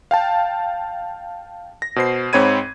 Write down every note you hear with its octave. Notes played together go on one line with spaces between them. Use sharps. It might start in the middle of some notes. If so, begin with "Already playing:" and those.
F5 G5 A5
A#6
B2 C5 C7
G#2 C4 C#5 B5 G#6 D#7